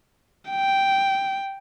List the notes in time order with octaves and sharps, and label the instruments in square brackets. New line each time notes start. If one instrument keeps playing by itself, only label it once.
[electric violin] G5